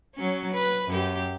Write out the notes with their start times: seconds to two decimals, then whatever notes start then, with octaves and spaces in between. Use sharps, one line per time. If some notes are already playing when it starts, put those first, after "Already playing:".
0.15 F#3 C#4
0.53 B4
0.88 F#2 G4